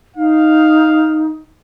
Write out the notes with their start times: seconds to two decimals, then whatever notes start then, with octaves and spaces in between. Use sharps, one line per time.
0.16 D#4 F5